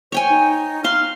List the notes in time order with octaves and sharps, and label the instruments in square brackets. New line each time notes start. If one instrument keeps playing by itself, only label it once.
[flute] C5 [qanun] C#5 G5 G#5
[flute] D#4
[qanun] F5 C6 [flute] F6